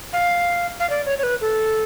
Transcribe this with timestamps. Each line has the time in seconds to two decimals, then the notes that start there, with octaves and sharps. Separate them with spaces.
0.13 F5
0.80 F5
0.90 D5
1.06 C#5
1.18 C#5
1.23 B4
1.41 A4